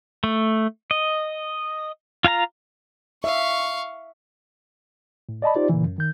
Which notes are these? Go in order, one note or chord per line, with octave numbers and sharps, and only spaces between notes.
A3
D#5
F4 F5 G#5 A#5
E5 F5 C#6
A2
D5 D#5 A5 B5
D#4 F4 G4 C5 D5
A#2 C#3 E3
F#2
D#3 G6